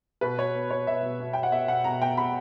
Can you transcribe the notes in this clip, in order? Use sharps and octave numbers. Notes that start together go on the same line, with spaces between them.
B2 B4
B2 C#5
B3
B2 C#5
B2 E5
B2
B2
B2 G5
F#5
B3 E5
B2 F#5
B2 A#5
B3 G5
B3 B5